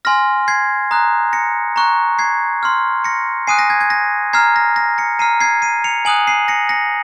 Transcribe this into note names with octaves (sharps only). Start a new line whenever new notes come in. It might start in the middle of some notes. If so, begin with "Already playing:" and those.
G#5 C6 F6 A#6
G#6 C7
A#5 D#6 F#6
A#6 C#7
A#5 C#6 F#6
G#6 C7
C6 F6
A#6 C#7
G#5 D#6 F#6 C7 D#7
A#6
G#6
G#6
A#6
A#5 F6 G#6 C7
A#6
A#6
A#6 C#7
A#5 F6 C7 D#7
G#6 C7
C7 D#7
C#7 F7
G#5 D#6 F#6 D#7 F#7
C7 D#7
A#6 C#7
A#6 C#7